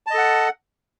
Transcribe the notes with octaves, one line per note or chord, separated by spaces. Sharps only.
A4 D#5 F#5 A5